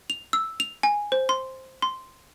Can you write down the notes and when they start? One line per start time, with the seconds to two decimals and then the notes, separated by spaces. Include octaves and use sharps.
0.10 F7
0.33 E6
0.60 F7
0.83 G#5
1.12 C5
1.29 C6
1.82 C6